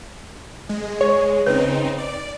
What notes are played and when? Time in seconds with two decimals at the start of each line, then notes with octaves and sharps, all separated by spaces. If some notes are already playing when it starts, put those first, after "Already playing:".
0.69 G#3
1.01 C#5
1.47 C#3 C4 D#4 B4
1.98 D5